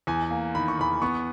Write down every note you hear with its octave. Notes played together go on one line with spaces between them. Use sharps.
E2 G#5
A#3
D#3 B5
C#6
E2 B5
B3 C#6